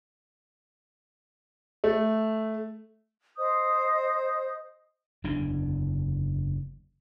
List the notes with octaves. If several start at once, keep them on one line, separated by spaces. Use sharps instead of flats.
A3
C5 D#5 D#6 G6
F#1 E2 D3 D4